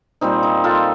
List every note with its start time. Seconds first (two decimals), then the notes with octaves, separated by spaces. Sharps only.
0.21 A#2 G3 C4 D#4
0.43 D#4
0.64 F4 A4